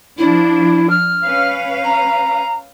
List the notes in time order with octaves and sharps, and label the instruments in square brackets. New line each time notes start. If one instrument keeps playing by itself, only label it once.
[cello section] F3 D4 [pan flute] E4
[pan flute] F6
[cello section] C#4 B4 F5
[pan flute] A#5